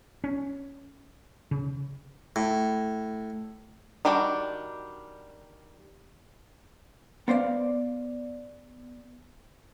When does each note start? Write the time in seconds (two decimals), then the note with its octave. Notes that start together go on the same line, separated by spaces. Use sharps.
0.24 C#4
1.51 C#3
2.36 A2
4.05 D#3 G3 D4 F#4 G5
7.28 B3 C5 D5 F5